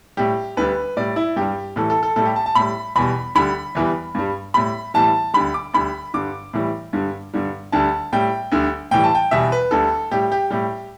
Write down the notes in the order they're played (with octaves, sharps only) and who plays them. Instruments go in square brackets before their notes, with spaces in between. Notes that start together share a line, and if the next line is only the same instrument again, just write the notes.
[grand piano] A2 G3 G4
D2 D3 G3 B4
A2 G3 D5
E4
G2 G3 G4
A2 E3 G3 A4
A4
A4
A2 G3 A4
G4
A5
A5
A2 G3 B5
E2 B2 G3 B5
D2 D3 G3 B5
E2 E3 G3
G2 G3
A2 G3 B5
A2 E3 G3 A5
D2 D3 G3 B5
D6
D2 D3 G3 B5
G2 D3 G3 D6
A2 E3 G3
G2 D3 G3
G2 D3 G3
D2 D3 G3 A5
A2 G3 G5
D2 D3 G3
A2 E3 G3 G5
A5
G5
E2 B2 G3 E5
B4
D2 D3 G3 A4
A2 G3 G4
G4
A2 G3 G4